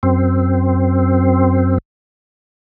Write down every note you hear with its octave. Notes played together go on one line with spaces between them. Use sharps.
F#2 C4